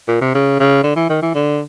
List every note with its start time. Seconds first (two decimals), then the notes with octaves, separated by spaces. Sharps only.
0.08 A#2
0.21 C3
0.35 C#3
0.60 C#3
0.83 D3
0.96 E3
1.09 D#3
1.22 E3
1.34 D3